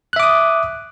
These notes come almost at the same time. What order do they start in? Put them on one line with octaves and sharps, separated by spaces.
F#6 E5 D6 D#6